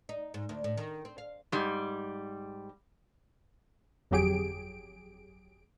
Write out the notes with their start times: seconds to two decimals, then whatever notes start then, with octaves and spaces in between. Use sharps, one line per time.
0.09 D#4
0.34 G#2
0.49 D2
0.64 A2
0.77 D#3
1.05 C4
1.18 F5
1.52 G#2 G3
4.11 G1 F2 F#3 G4 G#4 D7